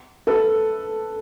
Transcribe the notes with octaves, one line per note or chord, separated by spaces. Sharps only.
A4 B4